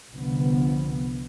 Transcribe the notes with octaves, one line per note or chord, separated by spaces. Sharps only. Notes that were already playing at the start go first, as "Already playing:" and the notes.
F1 C2 D3 F3 B3